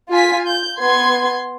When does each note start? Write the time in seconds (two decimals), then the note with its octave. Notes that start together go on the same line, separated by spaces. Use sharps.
0.11 F4 G#5 B6
0.47 G6
0.80 B3 C6 G#6